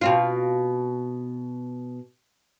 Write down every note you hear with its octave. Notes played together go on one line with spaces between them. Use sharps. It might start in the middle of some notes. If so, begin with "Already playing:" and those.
B2 C4 F4